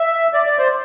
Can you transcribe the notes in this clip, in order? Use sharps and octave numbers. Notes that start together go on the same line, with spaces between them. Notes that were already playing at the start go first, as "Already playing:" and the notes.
Already playing: E5
D5
D5
C5